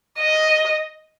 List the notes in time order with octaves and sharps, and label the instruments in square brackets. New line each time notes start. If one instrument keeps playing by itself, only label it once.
[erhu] D#5